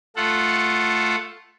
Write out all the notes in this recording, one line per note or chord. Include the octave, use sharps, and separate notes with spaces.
A3 F4 A4 F#5